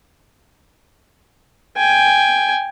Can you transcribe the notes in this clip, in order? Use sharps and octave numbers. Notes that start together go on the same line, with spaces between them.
G5 G#5